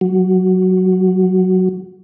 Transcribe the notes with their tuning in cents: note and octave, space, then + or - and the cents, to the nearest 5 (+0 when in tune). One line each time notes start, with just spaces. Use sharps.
F#3 +5